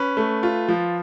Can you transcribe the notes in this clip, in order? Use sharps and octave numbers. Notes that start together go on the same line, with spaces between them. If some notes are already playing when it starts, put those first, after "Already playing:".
Already playing: C#4 B4
A3
F4
F3